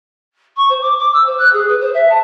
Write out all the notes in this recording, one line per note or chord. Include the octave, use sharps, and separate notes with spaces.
C#6
C5
D6
D6
E6
C5
F#6
G#4
B4
C5
E5
A5